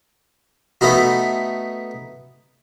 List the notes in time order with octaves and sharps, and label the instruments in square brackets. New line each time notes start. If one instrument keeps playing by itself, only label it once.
[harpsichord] A3 B3 D#4 F#4